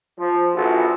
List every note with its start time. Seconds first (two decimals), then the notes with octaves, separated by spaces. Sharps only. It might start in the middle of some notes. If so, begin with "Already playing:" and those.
0.18 F3
0.55 A#1 E3 F3 F#4 A4